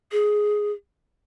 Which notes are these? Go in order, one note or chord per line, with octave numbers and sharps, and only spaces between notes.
G#4